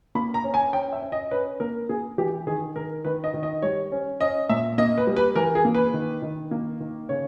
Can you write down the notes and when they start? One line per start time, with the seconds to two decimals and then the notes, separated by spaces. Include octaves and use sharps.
0.15 A#3 B5
0.34 A#5
0.44 C#4
0.54 G#5
0.73 C#4 G5
0.93 E5
1.02 C#4
1.12 D#5
1.31 C#4 B4
1.60 A#3 A#4
1.89 A#3 G#4
2.18 E3 G4
2.47 D#3 G#4
2.76 D#3 A#4
3.05 D#3 B4
3.24 D#5
3.34 D#3
3.43 D#5
3.62 G3 C#5
3.92 C#4
4.20 C#4 D#5
4.49 A#2 E5
4.78 A#3 D#5
4.98 B4
5.07 G3
5.16 B4
5.36 E3 A#4
5.55 G#4
5.65 A#3
5.75 B4
5.94 D#3
6.22 D#3
6.51 A#3
6.80 D#3
7.09 C#3 C#5